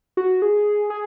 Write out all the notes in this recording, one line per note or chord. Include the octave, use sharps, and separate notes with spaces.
F#4
G#4
G#4